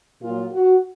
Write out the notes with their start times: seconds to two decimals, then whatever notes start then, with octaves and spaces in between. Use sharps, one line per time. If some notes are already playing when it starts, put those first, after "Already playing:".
0.22 A#2 F#3 F4
0.53 F#4